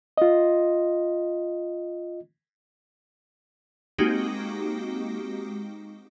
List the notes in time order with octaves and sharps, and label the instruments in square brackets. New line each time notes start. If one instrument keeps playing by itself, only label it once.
[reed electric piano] F4 D#5
[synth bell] G#3 A#3 C4 D#4 F#4 G4